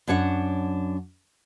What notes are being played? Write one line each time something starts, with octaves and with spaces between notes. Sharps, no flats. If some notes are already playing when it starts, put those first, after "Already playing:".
F#2 D4 C#5 F#5